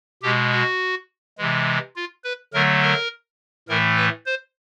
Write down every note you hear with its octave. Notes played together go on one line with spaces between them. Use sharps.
B2 G#3 G4
F#4
C3 E3 G#3
F4
B4
D3 F#3 A3 A#4
A#4
A2 E3 A3 A#4
B4
C5